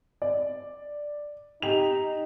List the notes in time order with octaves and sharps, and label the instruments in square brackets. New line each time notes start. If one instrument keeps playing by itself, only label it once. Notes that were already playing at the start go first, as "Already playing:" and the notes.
[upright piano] D5
[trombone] D#4 [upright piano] G4 F7